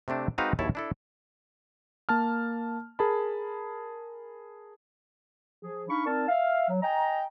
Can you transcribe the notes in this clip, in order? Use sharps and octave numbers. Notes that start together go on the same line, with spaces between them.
C3 A3 C4 D4
G#3 C4 D#4 F#4 B4 F5
A#1 D#2 E4 C#5 A5
D4 E4 A4
A#3 A5 F6
G#4 A#4 A5 B5
F3 G#4
D4 D#4 F5 B5 C#6
C4 D#4 A#4 D5 A5
E5 F5
F#3
D#5 G5 G#5 A#5